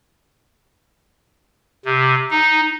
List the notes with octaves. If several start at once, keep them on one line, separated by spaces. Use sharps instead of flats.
C3
D#4